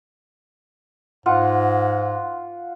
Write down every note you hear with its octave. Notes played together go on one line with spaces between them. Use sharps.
G#2 F4 F#5